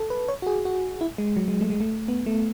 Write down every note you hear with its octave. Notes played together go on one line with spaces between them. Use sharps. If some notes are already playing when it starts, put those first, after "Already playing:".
Already playing: A4
B4
C#5
F#4
G#4
F#4
E4
G#3
F#3
G#3
A3
G#3
A3
B3
A3